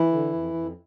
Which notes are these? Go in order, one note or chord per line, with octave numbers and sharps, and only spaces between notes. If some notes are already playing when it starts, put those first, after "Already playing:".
Already playing: E3 E4
D3
F2
F2